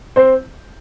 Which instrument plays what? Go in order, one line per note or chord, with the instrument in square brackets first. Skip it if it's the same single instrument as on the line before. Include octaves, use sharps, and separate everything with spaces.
[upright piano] C4 C5